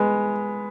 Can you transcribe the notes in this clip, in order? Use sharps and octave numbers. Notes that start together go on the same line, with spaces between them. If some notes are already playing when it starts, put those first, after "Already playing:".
Already playing: G#3 B3